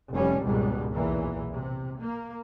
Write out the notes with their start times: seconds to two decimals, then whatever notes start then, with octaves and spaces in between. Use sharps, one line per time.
0.13 F1 A2 G3 C#4
0.43 G#1 C#2 G#2 B2 G3
0.93 B1 E2 A#2 E3
1.53 C3
2.00 A#3